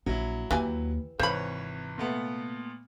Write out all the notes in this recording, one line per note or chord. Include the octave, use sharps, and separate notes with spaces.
A#1 F#3 E4
D#2 E3 G4 G#5
G#1 C3 E3 C5 C#5 B5
A#2 A3 B3